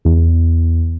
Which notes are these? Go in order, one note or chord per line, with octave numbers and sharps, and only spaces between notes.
E2